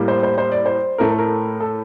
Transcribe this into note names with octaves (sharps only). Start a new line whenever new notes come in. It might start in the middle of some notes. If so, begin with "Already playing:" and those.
Already playing: A2 G3 A#3
C5
C5
C5
D5
C5
A2 A3 A#4
A4
A#4
A4